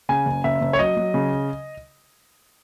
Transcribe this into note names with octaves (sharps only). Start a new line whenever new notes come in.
C#3 G#5
F#1
F#1 E5
F#1
C#5
F#3 D#5
F#3
C#3